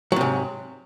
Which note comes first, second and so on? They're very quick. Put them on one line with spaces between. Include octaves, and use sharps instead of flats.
F#3 C3 G#2